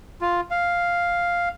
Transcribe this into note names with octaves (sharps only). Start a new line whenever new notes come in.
F4
F5